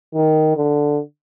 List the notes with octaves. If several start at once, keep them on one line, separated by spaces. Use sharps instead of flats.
D#3
D3